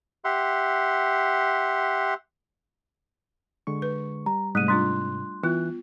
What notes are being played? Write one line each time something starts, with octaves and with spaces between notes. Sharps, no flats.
G4 E5 F#5 C6
D3 G#3 C#6
B4
G3 A#5
G#2 C3 G3 A3 F#6 D#7
G3 D4 F4 C6 F#6
E3 B3 F4 F#6